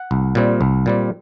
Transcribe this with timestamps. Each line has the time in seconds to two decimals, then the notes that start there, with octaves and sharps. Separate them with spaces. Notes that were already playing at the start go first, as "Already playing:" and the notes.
Already playing: F#5
0.11 C2
0.35 A#2 G3 C4
0.61 C2
0.86 A#2 G3 C4